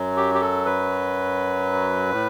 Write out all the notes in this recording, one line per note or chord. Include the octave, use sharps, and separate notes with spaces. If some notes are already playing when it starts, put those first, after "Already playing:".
Already playing: F#2 F#3
G4
G4
A4
B4
A2